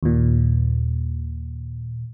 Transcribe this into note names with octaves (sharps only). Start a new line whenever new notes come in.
D#2 A#2